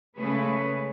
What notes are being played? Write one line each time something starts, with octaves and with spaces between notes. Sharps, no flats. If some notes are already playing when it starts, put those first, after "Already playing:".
C#3 G#3 A3 G#4 B4 C#5